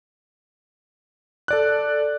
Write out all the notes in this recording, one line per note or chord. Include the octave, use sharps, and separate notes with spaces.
A4 D5 F#6